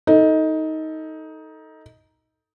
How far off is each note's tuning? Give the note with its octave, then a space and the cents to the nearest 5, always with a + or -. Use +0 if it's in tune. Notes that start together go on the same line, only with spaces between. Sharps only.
D#4 +15 A4 +10